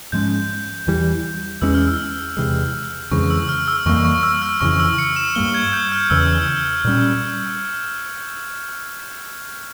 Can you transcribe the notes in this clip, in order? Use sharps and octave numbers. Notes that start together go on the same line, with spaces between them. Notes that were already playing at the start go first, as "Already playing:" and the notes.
G#2 F3 G#3 C#4 G6
E2 E3 G3
E2 E3 G#3 C#4 E6
F6
E6
E2 C3 E3 G#3
F2 C#3 E3 G#3 C#6
E6
F6
E6
F2 E3 G3 A#3 C#6
C#6
E6
F6
F2 C#3 E3 C#6
E6
C#7
E7
G2 G3 A#3 G7
G#6
G6
F6
E2 C#3 E3 E6
A#2 G3 C#4